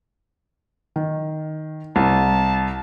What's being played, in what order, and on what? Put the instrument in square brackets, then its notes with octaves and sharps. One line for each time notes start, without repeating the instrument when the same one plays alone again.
[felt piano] D#3
[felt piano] C2 [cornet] A5